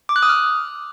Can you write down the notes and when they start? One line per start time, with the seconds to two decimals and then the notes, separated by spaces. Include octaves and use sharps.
0.09 D6
0.16 F#6
0.22 D#6
0.29 F6